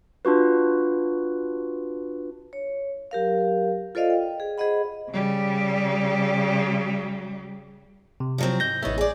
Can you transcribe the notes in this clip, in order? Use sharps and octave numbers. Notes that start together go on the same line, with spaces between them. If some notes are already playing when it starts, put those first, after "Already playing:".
D4 F4 F#4 B4
C#5
F#3 G4 A#4 F5
F4 A4 C5 D5 D#5 F5
G5
G#4
G#4 C5 D#5 F#5 B5
C#3 G3
C3
F3 F#3 C4
G#2 G6 A#6
A1 B3 D#4 C#5 E5
G#4 D5